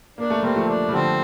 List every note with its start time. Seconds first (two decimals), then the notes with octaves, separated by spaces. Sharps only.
0.18 A#3 D4
0.30 A3
0.42 G3 A#3 C4
0.55 F3 A3
0.68 D4
0.88 G3
0.93 D3 F3 C4